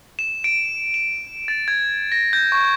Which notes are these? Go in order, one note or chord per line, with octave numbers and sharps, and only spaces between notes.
E7
D7
E7
A6
G#6
A#6
G6
C#6